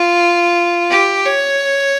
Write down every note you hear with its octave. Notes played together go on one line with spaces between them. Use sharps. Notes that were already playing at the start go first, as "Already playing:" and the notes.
Already playing: F4
G4
C#5